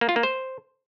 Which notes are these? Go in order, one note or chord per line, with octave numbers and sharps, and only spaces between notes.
A#3
F4
A#3
C5